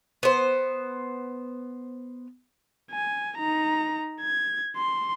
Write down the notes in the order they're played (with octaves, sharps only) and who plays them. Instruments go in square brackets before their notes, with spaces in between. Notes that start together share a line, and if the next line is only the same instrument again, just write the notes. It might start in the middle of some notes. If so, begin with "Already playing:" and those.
[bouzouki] B3 C5
[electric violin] G#5
D#4 A#5
G#6
C6